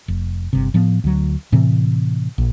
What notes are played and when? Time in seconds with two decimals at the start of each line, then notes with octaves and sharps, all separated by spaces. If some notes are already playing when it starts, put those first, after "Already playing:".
0.08 F1
0.53 G1 C3
0.74 A2 F3 B3
1.04 D2 F#3
1.52 A2 C3 E3 C4
2.38 A#1